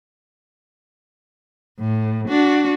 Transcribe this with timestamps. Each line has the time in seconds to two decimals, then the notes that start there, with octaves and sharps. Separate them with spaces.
1.80 A2
2.28 D4 F#4